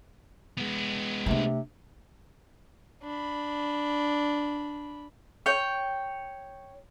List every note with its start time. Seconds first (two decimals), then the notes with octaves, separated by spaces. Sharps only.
0.57 G#3 B3
1.26 C3 A3 D4
3.02 D4 B5
5.46 C#5 G5